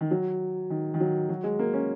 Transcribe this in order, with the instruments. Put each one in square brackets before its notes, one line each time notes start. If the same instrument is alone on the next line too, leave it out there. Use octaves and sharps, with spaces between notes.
[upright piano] D#3
F#3
D#3
D#3
F#3
F#3
G#3
A#3
C#4